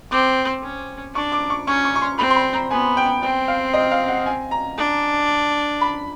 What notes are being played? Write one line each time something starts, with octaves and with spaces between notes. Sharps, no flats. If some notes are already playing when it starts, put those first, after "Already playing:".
C4 D6
C#4
D4 C#6
D6
C#6
C#4 C#6
C#6
C#6
C6
C4 B5
C6
B5
A#5
B3 G#5
G5
C4 G5
F5
D#5
F5
F#5
G#5
A#5
D4
B5